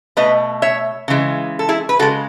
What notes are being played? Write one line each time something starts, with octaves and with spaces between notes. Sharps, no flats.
B2 A3 B4 D#5
C#5 E5
C#3 E3 G#3
A4
E4 G#4
B4
C#3 G#3 F#4 A4